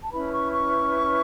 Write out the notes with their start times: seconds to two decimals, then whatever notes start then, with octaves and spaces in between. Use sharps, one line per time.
0.02 A5
0.11 C#4 E4 B4 B5
0.31 C#6
0.52 C#6